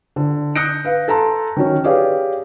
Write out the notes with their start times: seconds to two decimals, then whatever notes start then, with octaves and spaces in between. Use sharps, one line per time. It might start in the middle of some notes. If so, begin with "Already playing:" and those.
0.16 D3
0.56 D#6 F#6 G6 A#6 C#7 D7
0.85 B4 F5
1.08 A4 A5 A#5 C6
1.57 D#3 F#3 C#4
1.84 G4 G#4 B4 C#5 D5 F5